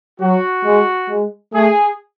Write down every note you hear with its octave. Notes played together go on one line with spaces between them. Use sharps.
F#3 F#4
G#3
G#3
A3 G#4